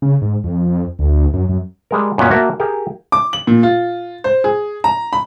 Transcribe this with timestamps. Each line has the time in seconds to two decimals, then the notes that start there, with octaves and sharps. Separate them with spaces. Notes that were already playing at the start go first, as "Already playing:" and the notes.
0.02 C#3
0.22 G#2
0.44 F2
0.99 D2
1.34 F#2
1.49 F#2
1.91 G3 G#3 A#4
2.18 F#2 A#2 F#3 B3 C#4
2.31 A#3 F#4 A#4 E5 A5
2.60 G4 G#4 A#4
3.12 D6
3.33 F#7
3.47 A#2
3.63 F4
4.24 C5
4.44 G#4
4.84 A#5
5.13 B5